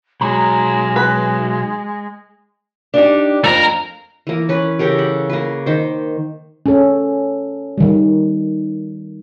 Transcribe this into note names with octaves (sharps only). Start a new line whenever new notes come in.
B2 F#3 G#3 A#5
B4
D4 D#4 G4
F2 A3 A#4
E3 A#3
C#4 B4
C#3 G4 A4 A#4
F#5
A#3 B4
D#3 C5
C#4 A4
D#3 G3